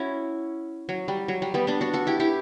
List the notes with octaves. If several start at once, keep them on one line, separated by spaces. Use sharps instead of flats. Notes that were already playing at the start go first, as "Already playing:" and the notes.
Already playing: C#4 E4 F#4
F#3
G3
F#3
G3
G3 B3
B3 D4
D4 F#4
F#4 A4
E4 G4
E4 G4